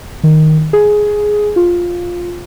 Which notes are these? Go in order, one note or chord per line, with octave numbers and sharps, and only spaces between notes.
D#3
G#4
F4